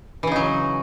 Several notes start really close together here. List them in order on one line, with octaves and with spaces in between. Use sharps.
E3 C#3 D#4 F#3